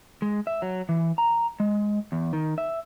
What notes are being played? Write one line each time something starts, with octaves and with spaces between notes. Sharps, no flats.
G#3
E5
F#3
E3
A#5
G#3
E2
D#3
E5